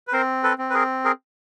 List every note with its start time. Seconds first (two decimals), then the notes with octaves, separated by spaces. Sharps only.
0.07 B4
0.13 C4 A#4 C5
0.43 A4 B4
0.58 C4
0.70 B4
0.74 G#4 A#4
1.05 G#4 A#4